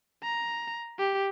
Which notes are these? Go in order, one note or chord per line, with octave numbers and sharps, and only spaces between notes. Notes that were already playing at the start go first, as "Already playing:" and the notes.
A#5
G4